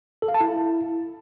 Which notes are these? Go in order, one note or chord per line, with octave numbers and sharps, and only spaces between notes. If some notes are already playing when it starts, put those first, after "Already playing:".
A4
F5
A5
E4